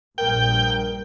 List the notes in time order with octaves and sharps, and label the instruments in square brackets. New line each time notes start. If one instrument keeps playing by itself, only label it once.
[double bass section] A#1 G2 [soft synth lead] A#4 [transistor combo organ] G5